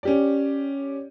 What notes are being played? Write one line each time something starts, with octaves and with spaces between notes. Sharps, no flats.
C#4 G4 D5